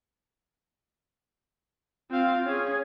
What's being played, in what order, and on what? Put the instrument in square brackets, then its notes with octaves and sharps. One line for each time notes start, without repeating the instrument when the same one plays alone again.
[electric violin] C4 F5 [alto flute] F4
[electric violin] C#4 G#4 [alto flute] C#5